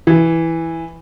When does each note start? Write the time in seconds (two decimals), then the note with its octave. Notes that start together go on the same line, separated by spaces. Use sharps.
0.07 E3